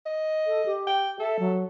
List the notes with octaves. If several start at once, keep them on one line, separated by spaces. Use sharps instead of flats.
D#5
A4
G4
G5
A4 E5
F#3